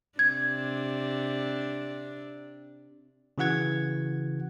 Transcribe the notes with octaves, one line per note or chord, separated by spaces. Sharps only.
C3 D4 G#6
C#3 E3 F#4 F#5 G#6